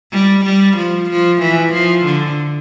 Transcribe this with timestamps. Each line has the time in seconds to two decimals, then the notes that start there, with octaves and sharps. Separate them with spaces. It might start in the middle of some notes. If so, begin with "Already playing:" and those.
0.13 G3
0.45 G3
0.77 F3
1.10 F3
1.42 E3
1.73 F3
2.05 D3